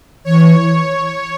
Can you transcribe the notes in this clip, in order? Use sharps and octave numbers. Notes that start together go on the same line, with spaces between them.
E3 C#5